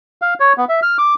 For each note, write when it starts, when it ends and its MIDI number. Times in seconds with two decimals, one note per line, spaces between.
0.22 0.34 77
0.40 0.53 73
0.57 0.65 59
0.69 0.80 76
0.82 0.97 89
0.98 1.14 86